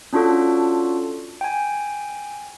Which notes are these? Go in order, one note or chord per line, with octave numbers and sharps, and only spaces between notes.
C#4 D4 F4 F#4 A4
G5 G#5